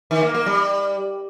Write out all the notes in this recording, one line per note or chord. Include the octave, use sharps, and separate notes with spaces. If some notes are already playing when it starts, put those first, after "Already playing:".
D#3
A#3
A#3
G3